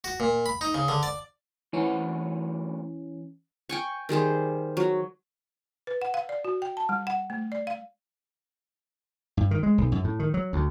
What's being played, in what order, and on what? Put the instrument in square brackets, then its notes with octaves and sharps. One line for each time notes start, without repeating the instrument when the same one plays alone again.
[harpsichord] F#4
A#2
B5
D#4
C#3
D3
D5
[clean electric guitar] A2 C3 F#5 [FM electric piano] E3 C#4
[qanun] G5 G#5 C#6
D#3 G3 G#4 C5
F#3
[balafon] B4
F#5
F5
D5
F#4
G5
A5
G3
F#5
A3
D5
F5
[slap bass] G2
D#3
G#3
B1
F#2
A2
D#3
F#3
D2